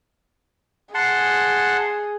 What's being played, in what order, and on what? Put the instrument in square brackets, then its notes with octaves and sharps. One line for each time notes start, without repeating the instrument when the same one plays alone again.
[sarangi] G#4 [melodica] F#5 A5 C6